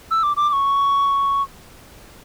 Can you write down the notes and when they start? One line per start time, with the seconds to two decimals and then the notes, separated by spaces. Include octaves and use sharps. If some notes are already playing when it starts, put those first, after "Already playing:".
0.11 E6
0.23 D6
0.37 D6
0.49 D6
0.53 C#6